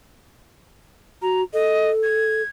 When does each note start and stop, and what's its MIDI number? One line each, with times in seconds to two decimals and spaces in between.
1.22 1.43 66
1.22 1.41 82
1.53 2.42 69
1.53 1.90 75
2.03 2.48 92